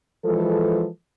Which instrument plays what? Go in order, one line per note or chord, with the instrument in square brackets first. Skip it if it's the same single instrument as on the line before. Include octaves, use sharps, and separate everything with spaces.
[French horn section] E3 F3 G#3 A4